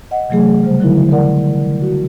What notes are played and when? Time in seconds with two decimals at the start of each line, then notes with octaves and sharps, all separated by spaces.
0.11 D#5 F#5
0.29 C3 E3 F#3 A3 G#4
0.63 C#3 G3 C5
0.80 D3 F3 F#3 D#4 E4 A#4
1.11 A#4 D5 F#5
1.82 F#4